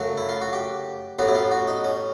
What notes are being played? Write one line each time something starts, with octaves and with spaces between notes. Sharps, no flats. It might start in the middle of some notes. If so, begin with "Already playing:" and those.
Already playing: F#2 C#3 F#3 A3 F#4
E4
F4
F#4
G4
A1 A2 F#3 B3 F#4
E4
F4
F#4
D#4
C#4